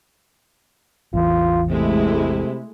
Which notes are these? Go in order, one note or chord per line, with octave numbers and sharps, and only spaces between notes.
A1 E2 E3 F4
C3 G#3 A3 E4